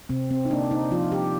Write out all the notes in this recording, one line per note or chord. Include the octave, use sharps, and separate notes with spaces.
C3 C4
C4
D#4
A#3 D4
D#4
F3 F4
G4